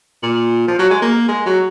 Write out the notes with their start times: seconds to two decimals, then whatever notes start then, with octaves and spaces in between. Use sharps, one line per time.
0.23 A#2
0.68 F3
0.79 F#3
0.90 G#3
1.02 A#3
1.28 G#3
1.46 F#3